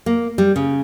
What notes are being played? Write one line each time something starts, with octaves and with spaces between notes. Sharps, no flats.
A#3
G3
C#3